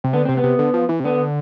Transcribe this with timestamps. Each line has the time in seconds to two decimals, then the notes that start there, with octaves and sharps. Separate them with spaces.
0.04 C3
0.13 D3 B3
0.25 C3 C4
0.37 B3
0.44 C3
0.59 D3
0.74 F3
0.89 E3
1.00 C3
1.04 D3 B3